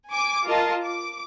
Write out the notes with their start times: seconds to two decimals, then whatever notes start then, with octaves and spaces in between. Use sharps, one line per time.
0.11 G#5 D6
0.47 F4 A#4 D#5 A5
0.85 D6